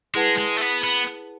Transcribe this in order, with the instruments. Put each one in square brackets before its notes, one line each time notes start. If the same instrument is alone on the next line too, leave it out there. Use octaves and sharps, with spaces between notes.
[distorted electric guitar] G#3 [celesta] E4 G#4 B4 F#5 A5
[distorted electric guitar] G#3
A3
B3
B3